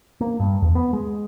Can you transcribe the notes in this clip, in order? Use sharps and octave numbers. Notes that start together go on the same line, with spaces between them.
A#3
G2
E2
B3
G#3